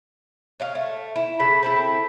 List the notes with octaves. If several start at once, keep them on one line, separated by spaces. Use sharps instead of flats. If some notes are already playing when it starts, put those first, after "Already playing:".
C#5 D#5 F5
A3
E4
C#3 A4 B5
C4 E4 A4 B5